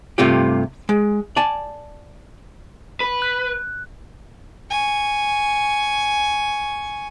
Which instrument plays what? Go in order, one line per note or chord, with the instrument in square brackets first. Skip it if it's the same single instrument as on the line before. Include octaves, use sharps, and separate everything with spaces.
[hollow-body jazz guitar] G2 C3 A3 F4 G4
G#3
D5 G#5 A5
[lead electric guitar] B4
[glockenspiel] F#6
[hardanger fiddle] G#5 C#6